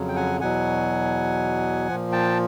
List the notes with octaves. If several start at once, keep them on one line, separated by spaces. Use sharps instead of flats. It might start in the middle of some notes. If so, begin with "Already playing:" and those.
Already playing: F2 C#3 F#3
G5
F#5 G#5
E2 B2 F#3 F#5 G#5
A#2 F3
G5 A5